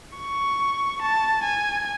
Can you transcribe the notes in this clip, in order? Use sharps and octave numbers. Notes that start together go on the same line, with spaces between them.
C#6
A5
G#5